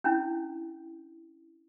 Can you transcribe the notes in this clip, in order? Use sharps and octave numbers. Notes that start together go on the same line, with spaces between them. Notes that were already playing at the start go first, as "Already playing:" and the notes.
C#4 D4 E4